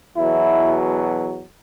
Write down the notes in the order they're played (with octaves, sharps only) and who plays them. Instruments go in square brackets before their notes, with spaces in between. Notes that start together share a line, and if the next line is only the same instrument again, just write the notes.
[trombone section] E2 B2 F#3 E4